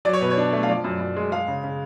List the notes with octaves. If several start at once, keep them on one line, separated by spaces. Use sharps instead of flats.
F#3 D5
C#5
B2 B4
C#5
D4
A3
F5
F3 D5
F#2
F#2
G#3
G#3 F5
C#3
C#3